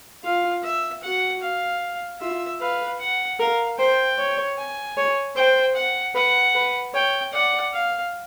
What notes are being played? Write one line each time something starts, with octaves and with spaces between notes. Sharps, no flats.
F4 F5
E5
F#4 F#5
F5
F4 E5
B4 F5
F#5
A#4 F5
C5 G5
C#5
G#5
C#5
C5 G5
F#5
B4 F#5
B4
C#5 G5
D5 F#5
F5